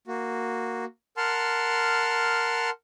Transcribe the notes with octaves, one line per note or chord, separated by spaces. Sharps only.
A#3 F#4
A#4 F#5 A5 C6 F6